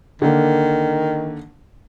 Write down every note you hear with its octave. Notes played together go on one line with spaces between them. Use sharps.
D3 D#3 A#3